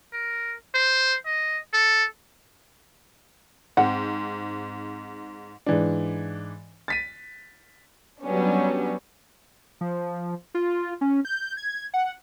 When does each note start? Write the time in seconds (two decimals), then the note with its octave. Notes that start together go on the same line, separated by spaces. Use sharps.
0.13 A#4
0.74 C5
1.25 D#5
1.73 A4
3.77 G#2 C4 F#5
5.66 G#2 E3 D4
6.88 A6 B6 D#7
8.22 F#3 G3 B3 C#4 D4
9.81 F3
10.54 F4
11.01 C#4
11.25 G6
11.57 G#6
11.94 F#5